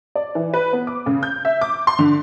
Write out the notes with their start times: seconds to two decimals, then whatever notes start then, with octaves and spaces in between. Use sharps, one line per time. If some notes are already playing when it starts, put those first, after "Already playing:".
0.15 D5
0.35 E3
0.54 B4
0.73 B3
0.87 D6
1.06 C#3
1.23 G6
1.45 E5
1.62 D6
1.87 C6
1.99 D3